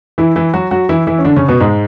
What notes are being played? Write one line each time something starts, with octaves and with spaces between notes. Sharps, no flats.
E3 E4
E3 E4
F#3 F#4
F#3 F#4
E3 E4
E3 E4
C#4
D3 D4
C#3 C#4
B2 B3
G#2 G#3